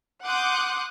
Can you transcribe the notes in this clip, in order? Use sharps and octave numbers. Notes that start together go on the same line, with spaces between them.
F#5 C6 D6 D#6 F#6 G6